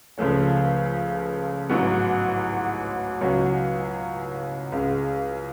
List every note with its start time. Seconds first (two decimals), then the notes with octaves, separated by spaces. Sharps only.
0.18 C#2 C#3 F3 A3 C#4
1.69 A1 G#2 F#3 B3 F#4
3.21 C#2 B2 F#3 C#4 F#4
4.72 C#2 C#3 G#3